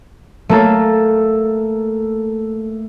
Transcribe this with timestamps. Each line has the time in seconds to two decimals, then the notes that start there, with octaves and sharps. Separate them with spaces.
0.49 A3 A#3 A4